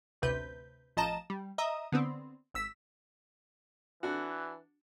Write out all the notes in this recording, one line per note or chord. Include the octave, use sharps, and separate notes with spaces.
A1 D2 C3 B4 G6
A1 F3 D#5 A5 A#5 E7
G3
D#5 E5 A#5 D#6
D3 B3 C4
G#1 E6 B6
E3 D4 F#4